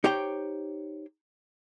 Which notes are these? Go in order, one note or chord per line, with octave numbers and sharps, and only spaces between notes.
D#4 G4 C5 C#5 G5